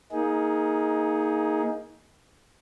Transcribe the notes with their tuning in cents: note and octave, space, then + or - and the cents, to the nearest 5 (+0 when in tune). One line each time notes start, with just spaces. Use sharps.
A#3 +0 D#4 +25 G#4 +0